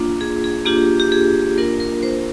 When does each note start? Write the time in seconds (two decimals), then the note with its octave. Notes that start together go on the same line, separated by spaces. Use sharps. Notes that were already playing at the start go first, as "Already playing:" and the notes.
Already playing: A#3 D4 F4
0.21 G#4
0.44 G#4
0.66 A#3 D4 F4 G4
1.00 G4
1.12 G#4
1.58 A#3 D4 F4 A#4
1.80 A#4
2.03 C5